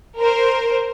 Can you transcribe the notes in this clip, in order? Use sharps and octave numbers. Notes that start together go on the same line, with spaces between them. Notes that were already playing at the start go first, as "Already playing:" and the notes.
A#4 C5